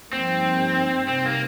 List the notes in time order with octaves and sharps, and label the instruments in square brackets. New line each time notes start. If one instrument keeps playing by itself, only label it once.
[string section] G2 F3 A#3 D#4 G4 [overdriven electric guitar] C4
[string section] C3 G3 D#4 [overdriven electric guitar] C4
[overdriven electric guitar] A#3